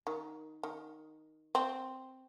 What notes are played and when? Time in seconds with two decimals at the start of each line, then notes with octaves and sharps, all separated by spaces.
0.07 D#3
0.63 D#3
1.55 C4